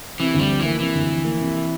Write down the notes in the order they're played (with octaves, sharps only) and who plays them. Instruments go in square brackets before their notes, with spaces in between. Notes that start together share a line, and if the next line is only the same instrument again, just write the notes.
[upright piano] C3 [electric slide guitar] E3
[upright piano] D2
[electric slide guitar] G3
[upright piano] F3
[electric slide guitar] E3
[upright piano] A#3
[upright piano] C3 [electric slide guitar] E3
[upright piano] D2
F3
A#3
C3